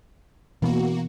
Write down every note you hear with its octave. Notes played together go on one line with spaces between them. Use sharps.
B2 E3 A#3 B3 F#4